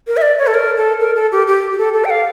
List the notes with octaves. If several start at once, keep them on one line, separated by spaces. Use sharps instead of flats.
A#4
E5
D5
C#5
A4
A#4
A4
A#4
A4
G4
G4
G4
A4
A4
G5
F5